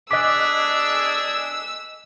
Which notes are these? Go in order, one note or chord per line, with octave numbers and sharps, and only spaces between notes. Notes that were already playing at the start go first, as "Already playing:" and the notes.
D4 G#4 D#5 D6 E6 F#6 B6